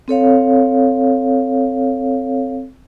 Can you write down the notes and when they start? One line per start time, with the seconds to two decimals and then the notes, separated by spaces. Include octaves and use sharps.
0.08 C4 A4 C#5 F5